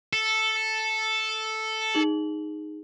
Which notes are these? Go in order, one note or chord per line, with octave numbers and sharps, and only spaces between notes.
A4
D#4 G#4 F#7